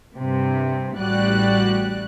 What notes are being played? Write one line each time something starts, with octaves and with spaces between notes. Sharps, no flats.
G2 C3
A1 A2 G3 F#4 D5 F#6